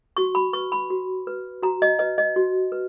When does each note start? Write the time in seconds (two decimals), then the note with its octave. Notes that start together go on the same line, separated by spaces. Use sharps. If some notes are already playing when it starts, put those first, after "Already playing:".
0.17 F#4 C#6
0.35 B5
0.53 B4 C#6
0.72 B5
0.90 F#4
1.27 B4
1.63 F#4 A#5
1.82 D#5
1.99 B4 D#5
2.18 D#5
2.36 F#4
2.72 B4